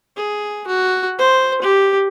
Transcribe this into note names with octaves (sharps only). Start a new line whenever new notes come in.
G#4
F#4
C5
G4